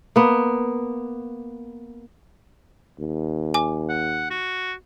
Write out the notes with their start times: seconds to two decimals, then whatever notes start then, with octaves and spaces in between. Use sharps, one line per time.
0.16 A#3 B3
2.99 D#2
3.54 G#5 D6
3.89 F#5
4.30 F#4